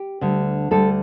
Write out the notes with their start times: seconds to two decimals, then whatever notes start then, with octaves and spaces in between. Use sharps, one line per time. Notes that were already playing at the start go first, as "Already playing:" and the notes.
Already playing: G4
0.21 D2 D3 G3
0.71 D2 D3 G3 A4